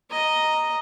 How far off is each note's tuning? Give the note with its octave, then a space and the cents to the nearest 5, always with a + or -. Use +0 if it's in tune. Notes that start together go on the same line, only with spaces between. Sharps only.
D#5 +0 A#5 +0